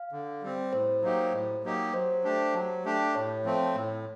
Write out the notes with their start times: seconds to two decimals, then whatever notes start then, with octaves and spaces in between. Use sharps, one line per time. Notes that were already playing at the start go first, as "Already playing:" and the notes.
Already playing: F5
0.12 D3
0.42 G3 C4
0.73 A2 C5
1.02 F#3 A#3 D#4 G4
1.32 A2
1.64 F#3 A#3 D#4 G4
1.94 F#3 C5
2.24 A3 D4 G4
2.54 F#3
2.85 A3 D4 G4
3.15 A2 C#5
3.45 F3 A3 C4
3.75 A2